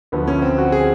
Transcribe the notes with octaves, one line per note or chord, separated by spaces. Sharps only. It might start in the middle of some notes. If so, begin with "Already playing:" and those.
D2 D3 F3 B3
C#4
C4
F#4
G#4